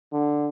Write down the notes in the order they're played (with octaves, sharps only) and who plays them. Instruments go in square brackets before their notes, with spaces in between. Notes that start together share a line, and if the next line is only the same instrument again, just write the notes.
[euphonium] D3